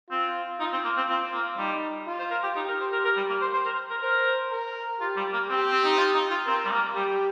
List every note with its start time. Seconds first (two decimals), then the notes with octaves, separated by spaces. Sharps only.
0.11 C4 F4
0.60 D#4 F4
0.73 C4
0.85 A#3
0.97 C4
1.09 C4 F4
1.34 A#3
1.58 G3 D#4
2.07 F4
2.19 C5
2.31 A#4
2.43 G4
2.56 D#4 G4
2.68 A#4
2.80 C5
2.92 A#4
3.04 A#4
3.17 G3
3.29 A#3
3.41 C5
3.53 C5
3.66 A#4
3.90 A#4
4.02 A#4 C5
4.51 A#4
5.00 F4 G4
5.17 G3
5.33 A#3
5.49 C4 G4
5.71 C4
5.84 D#4
5.98 F4
6.14 D#4
6.31 F4
6.47 C4 A#4
6.65 G3
6.72 A#3
6.95 G3 G4